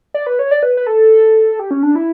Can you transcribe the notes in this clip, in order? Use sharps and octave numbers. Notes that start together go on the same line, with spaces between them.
D5
B4
C#5
D5
B4
B4
A4
G4
C#4
D4
E4